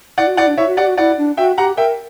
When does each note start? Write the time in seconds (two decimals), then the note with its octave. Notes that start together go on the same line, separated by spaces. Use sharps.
0.18 E4 D5 F#5
0.27 F#4
0.37 E4 D5 F#5
0.47 D4
0.58 E4 C#5 E5
0.67 F#4
0.77 G4 D5 F#5
0.87 F#4
0.97 E4 D5 F#5
1.18 D4
1.37 F#4 E5 G5
1.58 G4 F#5 A#5
1.77 A#4 E5 G5